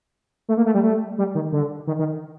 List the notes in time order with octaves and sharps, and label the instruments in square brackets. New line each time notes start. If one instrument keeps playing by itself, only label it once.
[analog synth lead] A3
A#3
A3
G3
A3
G3
D#3
D3
D#3
D#3